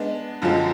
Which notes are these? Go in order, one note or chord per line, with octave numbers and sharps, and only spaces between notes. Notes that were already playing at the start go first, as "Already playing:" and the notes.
Already playing: G#3 B3 D4
F#2 D3 F3 G#3 C4